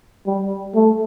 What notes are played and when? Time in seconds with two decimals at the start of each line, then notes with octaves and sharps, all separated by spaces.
0.27 G3
0.75 A3